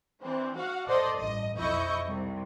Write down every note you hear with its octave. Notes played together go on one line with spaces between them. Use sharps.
E3 C4 D4
F#4 F5 F#5
A4 C5 D5 D#5 C6
A1 G2 D#5
B1 F2 E4 D#5 C#6 G6
C2 C3